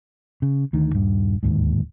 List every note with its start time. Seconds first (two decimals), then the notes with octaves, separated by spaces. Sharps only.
0.42 C#3
0.73 D2 D#3
0.92 D#1 G2
1.43 D1 D#2 G#2